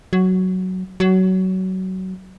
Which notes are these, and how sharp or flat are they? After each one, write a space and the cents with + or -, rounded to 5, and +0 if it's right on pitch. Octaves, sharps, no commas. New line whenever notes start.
F#3 +5
F#3 +20